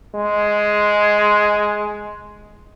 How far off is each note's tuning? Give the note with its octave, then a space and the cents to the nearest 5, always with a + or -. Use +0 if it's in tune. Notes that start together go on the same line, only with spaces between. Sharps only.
G#3 +5